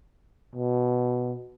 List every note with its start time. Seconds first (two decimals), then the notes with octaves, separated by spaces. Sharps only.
0.55 B2